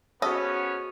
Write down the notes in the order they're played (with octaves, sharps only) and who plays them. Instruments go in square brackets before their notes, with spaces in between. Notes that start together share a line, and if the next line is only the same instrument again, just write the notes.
[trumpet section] B3 C#4 [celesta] F#4 G#4 C5 [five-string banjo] A4 D#5